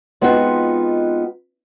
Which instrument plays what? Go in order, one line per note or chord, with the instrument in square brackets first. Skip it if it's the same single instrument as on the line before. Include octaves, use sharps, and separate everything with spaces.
[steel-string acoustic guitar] G#3 B3 C4 D#4 F4 F#4